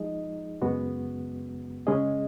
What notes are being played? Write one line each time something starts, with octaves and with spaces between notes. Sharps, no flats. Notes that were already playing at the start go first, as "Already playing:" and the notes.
Already playing: F3 G#3 D#4 G#4 D#5
F#2 C#3 G#3 B3 F#4
C#3 G#3 C#4 G#4 D#5